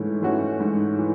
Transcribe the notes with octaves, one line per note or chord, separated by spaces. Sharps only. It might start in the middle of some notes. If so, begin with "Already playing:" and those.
Already playing: G#2 E3 A3 C#4
E3 A3 C#4 F#4
G#2
E3